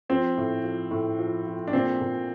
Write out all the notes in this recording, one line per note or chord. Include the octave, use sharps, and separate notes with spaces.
F3 C4
A2
F3
A2
F3
F3
D4
A#2 C4
A#2